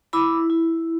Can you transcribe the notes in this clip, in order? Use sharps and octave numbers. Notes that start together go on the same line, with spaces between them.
E4 B5 D6
E4